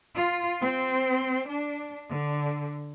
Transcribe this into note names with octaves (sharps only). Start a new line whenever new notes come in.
F4
C4
D4
D3